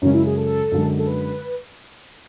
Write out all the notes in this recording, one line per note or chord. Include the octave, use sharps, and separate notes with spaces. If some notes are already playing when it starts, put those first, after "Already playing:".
F#2 C#3 G#3 C#4
E4
G#4
A4
F#2 D3 G#3
A4
B4